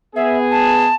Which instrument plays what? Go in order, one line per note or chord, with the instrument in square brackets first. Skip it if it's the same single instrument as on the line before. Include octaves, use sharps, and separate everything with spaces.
[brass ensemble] B3 G#4 [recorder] E5
[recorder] A5